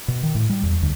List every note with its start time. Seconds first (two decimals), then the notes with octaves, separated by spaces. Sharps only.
0.08 B2
0.23 D#3
0.35 A2
0.49 G3
0.63 E2
0.82 D2